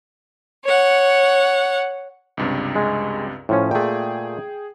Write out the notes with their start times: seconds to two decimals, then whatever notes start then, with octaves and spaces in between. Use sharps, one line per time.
0.64 C#5 F#5
2.37 C#2 G2 C3
2.75 G#3
3.49 A2 F3 C#4
3.71 A#2 A3 G#4 G5